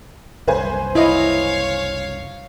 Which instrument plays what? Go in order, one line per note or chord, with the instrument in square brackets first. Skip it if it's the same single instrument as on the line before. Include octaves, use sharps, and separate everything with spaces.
[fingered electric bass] F#1 C2 [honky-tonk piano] B4 C5 G#5
[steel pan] E4 D#5 [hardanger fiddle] C#5 F5